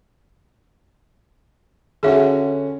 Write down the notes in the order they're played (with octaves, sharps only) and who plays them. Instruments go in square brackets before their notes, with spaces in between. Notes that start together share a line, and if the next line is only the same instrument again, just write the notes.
[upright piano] D3 C#4 F#4 [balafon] G#4 E5